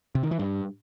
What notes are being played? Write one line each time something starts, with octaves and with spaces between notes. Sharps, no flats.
C3
D#3
E3
G2